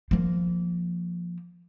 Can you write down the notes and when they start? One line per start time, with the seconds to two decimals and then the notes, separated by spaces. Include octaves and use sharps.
0.11 F3 A#3